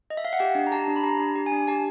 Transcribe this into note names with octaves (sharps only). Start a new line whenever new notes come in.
D#5
E5
F5
F#5
G4 G5
D4
A#5
G4 A5
D4
B5
G4 A#5
D4
G4
G#5
D4
G4 A5